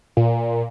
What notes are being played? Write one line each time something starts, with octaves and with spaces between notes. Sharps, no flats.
A#2